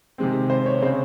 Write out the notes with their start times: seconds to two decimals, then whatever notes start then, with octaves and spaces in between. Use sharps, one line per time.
0.18 C3 D#3 G#3 C4
0.50 C5
0.66 C#5
0.82 C#3 G#3 C4 C5